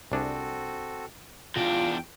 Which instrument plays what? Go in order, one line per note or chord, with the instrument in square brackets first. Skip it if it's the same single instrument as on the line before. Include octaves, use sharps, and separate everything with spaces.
[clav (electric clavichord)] C2 D4 G#4 [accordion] C4 F#4 A4
[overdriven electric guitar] E2 D4 [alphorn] F4 [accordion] G5